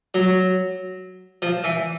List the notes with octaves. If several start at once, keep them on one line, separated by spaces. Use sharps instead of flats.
F#3
F3
E3